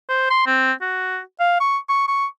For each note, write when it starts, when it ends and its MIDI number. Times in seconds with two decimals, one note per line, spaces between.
0.09 0.30 72
0.30 0.44 84
0.47 0.72 60
0.82 1.20 66
1.40 1.56 77
1.60 1.78 85
1.89 2.03 85
2.08 2.26 85